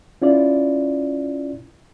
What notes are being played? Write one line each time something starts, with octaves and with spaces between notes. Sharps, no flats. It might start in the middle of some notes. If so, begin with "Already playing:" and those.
C#4 E4 F4 D5